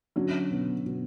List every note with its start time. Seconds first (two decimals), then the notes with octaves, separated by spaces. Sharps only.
0.16 D3 F#3 C#4
0.51 B2
0.86 B2